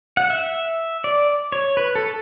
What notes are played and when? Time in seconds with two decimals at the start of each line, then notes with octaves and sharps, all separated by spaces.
0.17 F#5
0.30 E5
1.04 D5
1.52 C#5
1.77 B4
1.95 A4